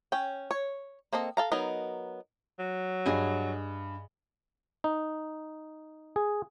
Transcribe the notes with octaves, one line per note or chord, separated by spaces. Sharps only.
C#4 G5
C#5
A#3 C4 A4 D#5
A4 F5 A#5
F#3 B3 D#4 A#4 D#5
F#3
G2 G#4 D#5 G#5
D#4
G#4